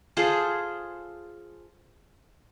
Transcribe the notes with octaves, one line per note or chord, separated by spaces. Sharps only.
F4 G#4 A4 C5